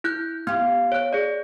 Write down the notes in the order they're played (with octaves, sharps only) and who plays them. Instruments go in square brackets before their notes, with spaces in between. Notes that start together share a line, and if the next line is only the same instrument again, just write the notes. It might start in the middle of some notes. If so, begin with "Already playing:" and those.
[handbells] E4 F#6 G6
[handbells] B3 [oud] F4 G4
[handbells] C#5 F#6
G#4 D5